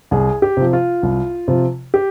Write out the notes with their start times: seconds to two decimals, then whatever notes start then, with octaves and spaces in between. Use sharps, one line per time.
0.11 C2 G#4
0.42 G4
0.57 C3 F3
0.73 F4
1.03 C2
1.48 C3 F3
1.94 G4